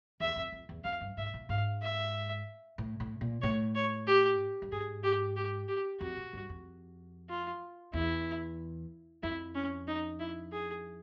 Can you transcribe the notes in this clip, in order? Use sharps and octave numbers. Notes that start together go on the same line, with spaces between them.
E2 E5
F2
F2
E2
F2 F5
G2
G#2 E5
A2
G#2 F5
E5
A2
A2
A#2
A2 C#5
C#5
G4
G2
G#2 G#4
G4
G4
G4
F2 F#4
A2
G2
F2
F4
E2 E4
F2 E4
C#4
D#4
E4
G#4